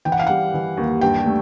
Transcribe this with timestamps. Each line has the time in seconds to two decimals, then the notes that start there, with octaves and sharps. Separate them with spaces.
0.05 E3 G5
0.12 F#5
0.19 F5
0.27 G3 F#5
0.54 E3
0.77 D#2
1.01 G2 G5
1.26 A3